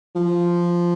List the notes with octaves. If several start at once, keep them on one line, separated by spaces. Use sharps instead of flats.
F3